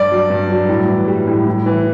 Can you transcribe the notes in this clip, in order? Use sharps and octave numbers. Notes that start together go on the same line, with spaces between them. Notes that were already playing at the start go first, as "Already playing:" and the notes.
Already playing: G2 D5
F#3
G2
F#3
A2
E3
G3
A2
A2
E3